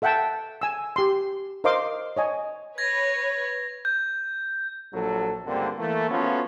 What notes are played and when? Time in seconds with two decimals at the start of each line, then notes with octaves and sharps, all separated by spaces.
0.02 A4 E5 F#5 G5 A5
0.61 G#5 E6
0.96 G4 C6
1.64 A#4 C5 D#5 F5 C6 D6
2.17 C#5 D#5 G#5
2.78 B4 C#5 G#6 A#6
3.85 G6
4.94 A#1 F#3 A4
5.47 C#2 G2 D3 A#3 C4
5.79 E3 A3 A#3
6.11 F3 A3 B3 C#4 F4 F#4